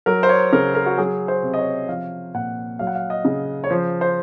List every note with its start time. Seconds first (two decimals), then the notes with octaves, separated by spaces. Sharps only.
0.06 F#3 A#4
0.23 C5
0.29 C#5
0.53 C#3 A#4
0.75 A#4
0.86 F#4
0.98 F#3 G#4
1.28 C5
1.43 C3
1.54 D#5
1.59 C#5
1.89 F3 F5
2.35 A#2 F#5
2.79 F#3 F5
2.87 F#5
2.95 F5
3.10 D#5
3.25 C#3
3.64 C#5
3.70 F3 C5
4.01 C5